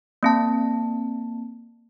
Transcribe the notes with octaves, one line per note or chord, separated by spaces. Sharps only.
A#3 C4 A5